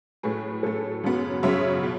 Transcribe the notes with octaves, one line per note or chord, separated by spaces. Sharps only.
A2 F#3 A3 G#4 B4
A2 F#3 A3 A4 C#5
F#2 C#3 F#3 B3
F#2 C#3 F#3 B3 C#5 E5
B2